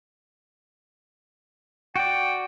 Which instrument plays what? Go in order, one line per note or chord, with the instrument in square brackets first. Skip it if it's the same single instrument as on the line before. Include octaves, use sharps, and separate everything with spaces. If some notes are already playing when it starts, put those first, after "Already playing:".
[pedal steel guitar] F#4 D5 [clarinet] G5